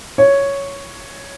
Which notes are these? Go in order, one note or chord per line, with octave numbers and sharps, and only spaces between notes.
C#5